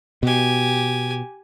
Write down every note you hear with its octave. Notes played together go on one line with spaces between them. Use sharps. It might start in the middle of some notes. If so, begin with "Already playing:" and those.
B2 G4 G#5